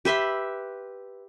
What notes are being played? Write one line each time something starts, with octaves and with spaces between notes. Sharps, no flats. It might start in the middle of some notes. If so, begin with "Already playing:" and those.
G4 B4 E5 C6